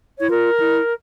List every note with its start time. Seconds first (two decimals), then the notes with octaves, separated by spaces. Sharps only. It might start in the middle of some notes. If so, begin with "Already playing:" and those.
0.19 E4 C#5
0.30 F4 A#4
0.60 E4